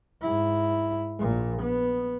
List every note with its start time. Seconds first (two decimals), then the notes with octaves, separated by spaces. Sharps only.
0.22 G#2 E4
1.19 A#1 A#2
1.63 B3